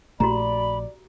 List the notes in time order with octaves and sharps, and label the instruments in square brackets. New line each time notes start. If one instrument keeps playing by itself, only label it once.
[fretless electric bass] A#1 A#2 A3 [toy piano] F#4 G4 A#5 [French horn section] D5 [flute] B5